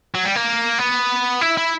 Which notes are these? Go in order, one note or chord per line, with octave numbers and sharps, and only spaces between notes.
F#3
G3
A#3
B3
E4
E4